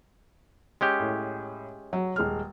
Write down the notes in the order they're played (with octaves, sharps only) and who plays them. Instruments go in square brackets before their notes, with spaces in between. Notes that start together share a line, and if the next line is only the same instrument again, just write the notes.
[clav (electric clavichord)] G#3 C#4 G4
[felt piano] A2
F#3
D#1 G#3 F6